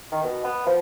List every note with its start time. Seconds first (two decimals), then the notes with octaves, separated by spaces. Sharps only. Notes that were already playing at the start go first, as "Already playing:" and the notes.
0.12 D#3
0.24 B2
0.44 B3
0.67 F3